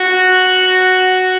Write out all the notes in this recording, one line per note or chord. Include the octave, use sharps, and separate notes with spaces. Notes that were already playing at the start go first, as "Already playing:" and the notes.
Already playing: F#4